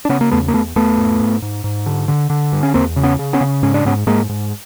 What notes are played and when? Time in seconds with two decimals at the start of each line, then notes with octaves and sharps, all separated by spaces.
0.05 D4
0.09 C#3 B3 C#4
0.21 A#3
0.31 E2 A3 B3
0.48 A#3
0.53 E2 A3 B3
0.76 E2 A3 B3
0.98 G#2
1.20 G#2
1.42 G#2
1.64 G#2
1.86 D3
2.08 D3
2.30 D3
2.52 G2
2.63 C#4
2.74 E2 A#3 C4
2.96 C#3
3.03 B3 C#4
3.19 C#3
3.33 B3 C#4
3.41 C#3
3.63 G#2 C#4
3.74 D4
3.85 G#2 B3 C#4
4.07 G#2 G#3 A#3
4.29 G#2